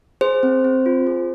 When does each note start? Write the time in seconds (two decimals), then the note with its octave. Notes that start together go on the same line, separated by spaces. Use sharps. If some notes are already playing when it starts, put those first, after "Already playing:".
0.21 G#4 C5
0.43 C4
0.64 C4
0.86 F4
1.07 G#4